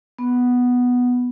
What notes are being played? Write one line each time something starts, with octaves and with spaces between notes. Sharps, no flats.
B3